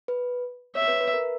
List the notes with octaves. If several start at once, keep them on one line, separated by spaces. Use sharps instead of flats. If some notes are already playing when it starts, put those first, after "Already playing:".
B4
C#5 E5
B4
B4
A#4